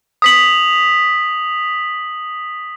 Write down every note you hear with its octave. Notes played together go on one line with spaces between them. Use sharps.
D#6 B6 F#7